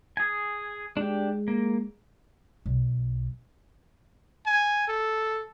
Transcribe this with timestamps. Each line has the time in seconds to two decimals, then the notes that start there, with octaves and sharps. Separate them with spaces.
0.17 G#4 G#5
0.97 G#3 D4 G4
1.48 A#3
2.66 B1
4.46 G#5
4.88 A4